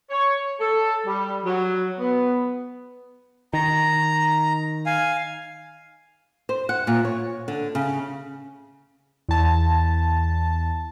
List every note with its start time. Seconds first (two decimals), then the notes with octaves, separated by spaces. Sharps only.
0.11 C#5
0.59 A4
1.07 G3
1.45 F#3
1.99 B3
3.53 D#3 A#5
4.86 F5 G#5
6.49 C5
6.69 F#5
6.87 A#2
7.05 C#5
7.48 D3
7.75 C#3
9.29 E2 A5